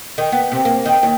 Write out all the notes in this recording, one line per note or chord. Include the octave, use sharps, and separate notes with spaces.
D#3
B3
C3
A#3
D#3
D#2